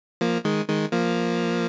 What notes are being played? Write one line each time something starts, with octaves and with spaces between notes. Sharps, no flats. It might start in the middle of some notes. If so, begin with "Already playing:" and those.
F3 A#3
D#3 G#3
D#3 G#3
F3 A#3